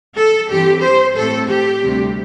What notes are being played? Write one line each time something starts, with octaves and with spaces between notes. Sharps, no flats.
A4
G2 E3 C4 G4
C5
A2 A3 C4 A4
G4
D2 C3 G3 C4